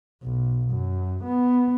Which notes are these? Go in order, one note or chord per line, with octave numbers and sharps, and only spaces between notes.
B1
F#2
B3